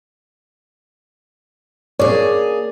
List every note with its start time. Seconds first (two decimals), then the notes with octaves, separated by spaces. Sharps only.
1.99 A#3 G#4 C#5 D5